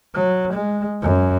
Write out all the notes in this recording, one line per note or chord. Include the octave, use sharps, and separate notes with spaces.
F#3
G#3
F#2